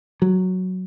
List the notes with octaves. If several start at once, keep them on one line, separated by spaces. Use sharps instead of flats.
F#3